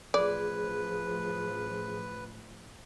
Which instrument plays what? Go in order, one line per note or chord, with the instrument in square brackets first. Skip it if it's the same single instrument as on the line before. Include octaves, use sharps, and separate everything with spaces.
[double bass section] A1 F3 [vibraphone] G#4 [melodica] B4 [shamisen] D5